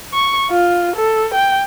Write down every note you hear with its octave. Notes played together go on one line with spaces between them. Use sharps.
C#6
F4
A4
G5